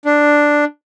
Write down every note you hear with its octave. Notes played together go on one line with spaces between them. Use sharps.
D4